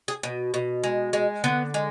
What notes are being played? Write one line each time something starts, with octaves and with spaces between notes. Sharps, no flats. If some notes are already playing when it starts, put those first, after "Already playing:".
G#4
B2
B2
G#3
G#3
D3 B3
G#3